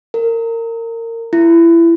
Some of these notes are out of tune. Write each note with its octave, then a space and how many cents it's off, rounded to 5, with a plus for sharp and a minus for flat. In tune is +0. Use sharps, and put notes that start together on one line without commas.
A#4 -25
E4 +25